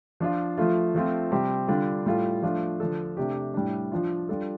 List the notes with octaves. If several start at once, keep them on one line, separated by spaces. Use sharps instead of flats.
F3 D4 F4
F3 A3 F4
F3 A3 C4 F4
C3 G3 C4 G4
D3 G3 D4 F4
A2 G3 F4 A4
F3 A3 D4 F4
D3 F3 D4 A4
C3 A3 D4 G4
A2 G3 D4
F3 D4 F4
G3 D4 F4 A4